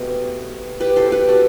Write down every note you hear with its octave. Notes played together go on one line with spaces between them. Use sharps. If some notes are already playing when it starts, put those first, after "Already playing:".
Already playing: B2 A3 C4 G4 B4
G4 B4
A4 C5
G4 B4
F#4 A4